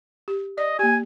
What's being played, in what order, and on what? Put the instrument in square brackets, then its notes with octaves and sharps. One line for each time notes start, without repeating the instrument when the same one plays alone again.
[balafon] G4
[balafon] D5 [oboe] D#5
[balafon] A#3 G4 [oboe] G#5